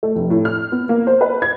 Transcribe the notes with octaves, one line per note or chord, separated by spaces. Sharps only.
A3
F1
A2
F6
B3
A#3
C5
B4
G#6